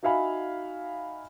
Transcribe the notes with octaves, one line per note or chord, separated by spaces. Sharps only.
D#4 F#4 E5 F5 G#5 B5